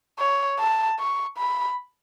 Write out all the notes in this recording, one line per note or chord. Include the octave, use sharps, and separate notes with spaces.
C#5
A5
C#6
B5